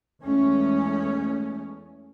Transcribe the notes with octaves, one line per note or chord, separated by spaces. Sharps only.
E2 G#3 A3 C#4